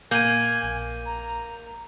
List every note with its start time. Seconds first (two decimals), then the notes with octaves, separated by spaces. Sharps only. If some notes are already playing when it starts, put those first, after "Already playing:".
0.11 A#2 A#3 G#5 G6 D#7
0.63 A#1
1.06 A#5